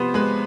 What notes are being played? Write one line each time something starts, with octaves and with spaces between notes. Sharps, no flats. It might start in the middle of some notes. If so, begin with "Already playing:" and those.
Already playing: C3 F3 B3 C5
G#3 B4